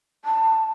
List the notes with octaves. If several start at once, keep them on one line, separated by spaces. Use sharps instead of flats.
A5